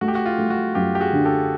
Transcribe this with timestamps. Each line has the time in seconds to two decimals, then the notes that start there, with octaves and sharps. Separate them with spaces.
0.01 A3 F#4
0.08 G4
0.15 F#4
0.26 F4
0.38 A3
0.50 F#4
0.75 F#2 F4 G4
0.95 G4
1.00 F#4 G#4
1.13 D3
1.25 G4 A4